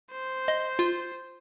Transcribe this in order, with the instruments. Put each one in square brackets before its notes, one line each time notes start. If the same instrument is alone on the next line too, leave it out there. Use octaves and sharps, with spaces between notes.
[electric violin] C5
[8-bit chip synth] D#5
F4